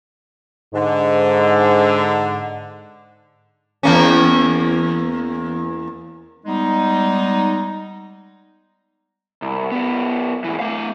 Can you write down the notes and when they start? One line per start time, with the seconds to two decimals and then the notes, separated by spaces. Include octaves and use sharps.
0.74 G#2 D3
3.83 E2 A#3 C#4
6.46 G3 G#3 B3 D#4
9.42 C2
9.72 F#2 B3
10.44 G#2 E3
10.60 A3 F5